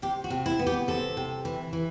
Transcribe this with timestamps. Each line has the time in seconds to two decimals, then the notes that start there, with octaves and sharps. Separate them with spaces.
0.02 C3 G4
0.24 F#4
0.30 C3
0.46 E4
0.59 B3
0.67 G4
0.88 C3 A4
1.17 C3
1.45 E3
1.73 E3